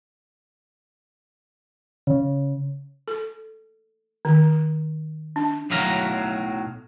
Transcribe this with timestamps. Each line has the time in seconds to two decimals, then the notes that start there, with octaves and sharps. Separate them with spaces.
2.07 C#3
3.08 A4
4.25 D#3
5.36 D4
5.70 B1 A2 F#3 F5 A#5